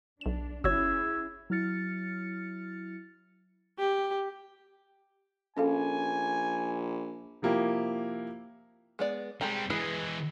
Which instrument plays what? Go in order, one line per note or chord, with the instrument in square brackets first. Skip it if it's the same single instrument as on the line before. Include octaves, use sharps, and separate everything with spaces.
[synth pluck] B1 E7 [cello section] D4
[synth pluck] G1 F#4 C#5 [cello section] C#4 E4 G#4 [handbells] E6 G#6
[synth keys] F#3 E4 F6 A6 C#7
[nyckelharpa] G4
[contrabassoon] A#1 [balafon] C#4 A4 F5 [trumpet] G#5
[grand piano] C3 F3 A#3 E4 G4
[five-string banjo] G#3 B3 D5
[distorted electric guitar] G3 C4 [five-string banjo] G#3 G4 A#5
[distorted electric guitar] E3 G#3 [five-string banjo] E4 G#4 B4